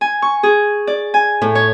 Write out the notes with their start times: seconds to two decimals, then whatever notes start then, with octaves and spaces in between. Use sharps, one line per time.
0.01 G#5
0.22 C#6
0.43 G#4
0.87 D5
1.14 G#5
1.41 A2
1.55 C#5